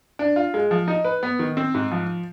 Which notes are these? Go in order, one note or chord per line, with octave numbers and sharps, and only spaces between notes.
D4
F4
G#3
F3
D#4
B4
B3
D#3
C4
G#2
F3